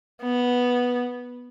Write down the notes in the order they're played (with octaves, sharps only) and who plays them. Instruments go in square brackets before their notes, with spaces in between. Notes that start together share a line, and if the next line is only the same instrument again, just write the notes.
[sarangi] B3